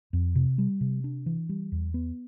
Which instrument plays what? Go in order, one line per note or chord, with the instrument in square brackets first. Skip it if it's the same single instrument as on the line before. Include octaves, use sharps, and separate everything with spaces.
[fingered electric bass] F2
C3
G3
C3
D4
E3
G3
E2
B3